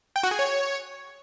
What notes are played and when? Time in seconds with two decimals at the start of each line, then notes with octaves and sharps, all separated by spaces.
0.16 G5
0.23 F#4
0.31 G#4
0.39 C#5